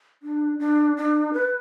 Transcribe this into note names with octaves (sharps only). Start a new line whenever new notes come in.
D4
D4
D4
B4